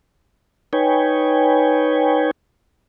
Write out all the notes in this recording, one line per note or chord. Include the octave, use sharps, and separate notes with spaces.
D#4 B4 C#5 G5 G#5